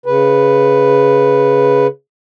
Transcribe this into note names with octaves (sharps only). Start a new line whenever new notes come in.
C#3 B4